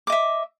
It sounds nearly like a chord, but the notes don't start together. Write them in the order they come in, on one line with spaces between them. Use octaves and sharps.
D6 D#5 E5